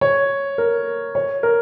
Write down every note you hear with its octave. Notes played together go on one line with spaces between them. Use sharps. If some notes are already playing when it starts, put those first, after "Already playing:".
C#5
A#4
C#5
A#4